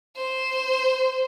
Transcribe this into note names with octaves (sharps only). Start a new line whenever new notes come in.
C5